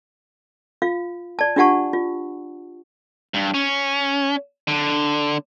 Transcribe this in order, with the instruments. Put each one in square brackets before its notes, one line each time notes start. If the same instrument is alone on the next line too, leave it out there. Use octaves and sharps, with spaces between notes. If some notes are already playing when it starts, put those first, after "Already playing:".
[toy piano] F4 F5
D5 A5
D4 F4 G4 F#5 A5 C#6
F4
[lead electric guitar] G2
C#4
D3